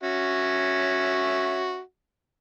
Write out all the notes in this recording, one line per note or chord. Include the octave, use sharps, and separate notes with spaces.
C#4 F#4 E5